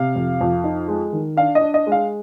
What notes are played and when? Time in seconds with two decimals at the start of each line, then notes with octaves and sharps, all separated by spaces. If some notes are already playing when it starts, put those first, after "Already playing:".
Already playing: C3 F5
0.15 F2
0.41 F2
0.64 D#4
0.88 G#3
1.13 D#3
1.37 D4 F5
1.55 D#5
1.61 D4
1.74 D#5
1.87 G#3
1.92 F5